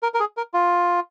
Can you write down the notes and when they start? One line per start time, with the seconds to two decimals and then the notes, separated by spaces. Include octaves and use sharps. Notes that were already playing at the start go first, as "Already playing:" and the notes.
0.03 A#4
0.14 A#4
0.20 G#4
0.37 A#4
0.54 F4